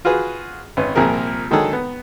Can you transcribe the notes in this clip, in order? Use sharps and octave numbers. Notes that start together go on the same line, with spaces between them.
F4 F#4 G#4 B4
G#1 C#4 B4
C2 A#2 F3 A#3 G#4 A#4
D3 D#3 F#3 G#3 G#4 A4
B3